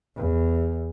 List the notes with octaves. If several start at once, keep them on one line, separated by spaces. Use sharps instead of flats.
E2